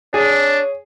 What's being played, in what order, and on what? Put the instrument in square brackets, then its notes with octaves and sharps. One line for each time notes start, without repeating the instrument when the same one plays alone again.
[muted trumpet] D4 [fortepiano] G#4 [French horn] C#5